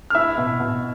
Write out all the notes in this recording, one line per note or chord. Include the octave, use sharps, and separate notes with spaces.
F6
E4 E5 E6
B2
B2